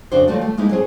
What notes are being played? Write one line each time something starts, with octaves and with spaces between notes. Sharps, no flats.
F2 C#3 D4 F#4 C5
D#2 F#3 A3 F4 F#4 D5
A3
G#3 A#3 D#4 E4
F#3 C4 G#4